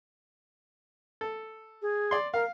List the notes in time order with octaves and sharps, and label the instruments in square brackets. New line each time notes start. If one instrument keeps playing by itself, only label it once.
[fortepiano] A4
[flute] G#4
[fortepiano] D5 C6
[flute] A#4 [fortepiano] F5